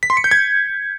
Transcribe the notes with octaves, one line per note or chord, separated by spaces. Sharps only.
B6
C6
C#7
G6
G#6